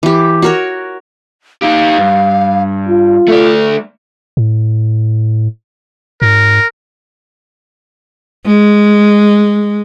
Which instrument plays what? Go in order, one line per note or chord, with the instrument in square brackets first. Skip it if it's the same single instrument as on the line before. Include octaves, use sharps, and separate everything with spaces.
[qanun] E3 G4
F#4 A#4 C#5
[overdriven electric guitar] D#4 G4 [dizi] F5
[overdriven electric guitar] G2
[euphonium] F4
[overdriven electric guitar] A3 D5 [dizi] A4
[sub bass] A2
[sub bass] G#2 [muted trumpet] A#4
[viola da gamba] G#3